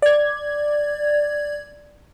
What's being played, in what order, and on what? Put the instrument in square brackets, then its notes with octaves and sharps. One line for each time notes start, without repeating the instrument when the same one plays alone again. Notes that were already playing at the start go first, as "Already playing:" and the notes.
[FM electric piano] D5 G#6